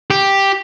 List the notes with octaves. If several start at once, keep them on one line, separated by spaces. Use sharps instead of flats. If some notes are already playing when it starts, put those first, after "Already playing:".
G4